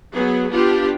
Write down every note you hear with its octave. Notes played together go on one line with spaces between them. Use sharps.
F#3 B3 G#4
B3 D4 F4 G4